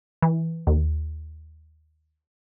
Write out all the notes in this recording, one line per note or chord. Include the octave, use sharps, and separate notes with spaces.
E3
D#2